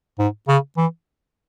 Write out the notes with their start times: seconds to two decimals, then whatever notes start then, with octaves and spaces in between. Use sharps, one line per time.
0.19 G#2
0.48 C#3
0.77 E3